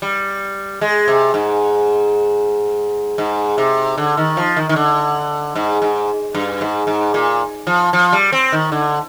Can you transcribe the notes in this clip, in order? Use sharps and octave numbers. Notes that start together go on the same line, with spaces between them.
G3
G#3
C3
G#2
G#2
C3
D3
D#3
F3
D#3
D#3
D3
G#2
G#2
G2
G#2
G#2
A#2
F3
F3
G3
C4
D#3
D3